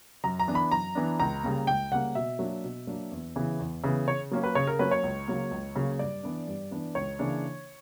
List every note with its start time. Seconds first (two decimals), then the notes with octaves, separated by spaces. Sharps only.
0.24 F#2 A#5
0.40 A#5
0.48 E3 B3 D4
0.55 B5
0.72 F#2 A#5
0.95 E3 B3 D4
1.20 C#2 A#5
1.43 C#3 G3 A#3
1.67 C#2 G5
1.92 C#3 G3 A#3 F#5
2.15 B2 E5
2.39 F#3 A#3 D4
2.64 B2
2.87 F#3 A#3 D4
3.12 E2
3.36 C#3 E3 B3
3.59 E2
3.84 C#3 E3 B3
4.08 C#3 C#5
4.31 F#3 A#3 C#4
4.44 B4
4.55 C#3 C#5
4.67 A#4
4.79 F#3 A#3 C#4 B4
4.91 C#5
5.03 C#2
5.28 C#3 F#3 A#3
5.51 C#2
5.76 C#3 F#3 A#3
5.99 G2 D5
6.23 E3 B3 D4
6.48 G2
6.71 E3 B3 D4
6.95 C#2 C#5
7.19 C#3 E3 A#3 D4